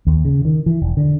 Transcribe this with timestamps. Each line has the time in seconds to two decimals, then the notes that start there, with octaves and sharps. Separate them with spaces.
0.07 D#2
0.25 C#3
0.45 D#3
0.66 E3
0.82 E1
0.97 D3